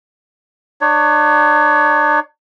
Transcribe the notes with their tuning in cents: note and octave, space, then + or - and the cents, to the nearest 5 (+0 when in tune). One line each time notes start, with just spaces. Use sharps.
D4 +40 C#5 +25